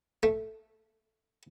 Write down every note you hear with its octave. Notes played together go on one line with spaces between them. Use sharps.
A3